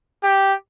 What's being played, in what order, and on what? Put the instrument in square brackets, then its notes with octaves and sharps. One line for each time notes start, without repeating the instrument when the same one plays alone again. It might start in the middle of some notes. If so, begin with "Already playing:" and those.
[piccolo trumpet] G4